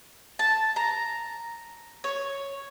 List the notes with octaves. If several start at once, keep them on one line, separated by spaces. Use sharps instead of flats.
A5
A#5
C#5